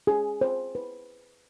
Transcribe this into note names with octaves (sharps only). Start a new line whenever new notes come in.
G#4
C5
B4